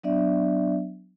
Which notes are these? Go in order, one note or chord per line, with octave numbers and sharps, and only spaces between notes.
F#3 B3 D4 D5 E5